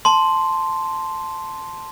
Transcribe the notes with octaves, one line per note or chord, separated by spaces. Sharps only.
A5 C6